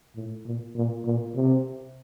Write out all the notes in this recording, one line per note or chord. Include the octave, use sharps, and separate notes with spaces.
A2
A#2
A#2
A#2
C3